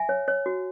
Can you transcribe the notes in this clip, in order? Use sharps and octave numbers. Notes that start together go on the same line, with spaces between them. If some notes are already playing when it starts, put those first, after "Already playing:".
Already playing: E5 G#5
C#5
C#5
F#4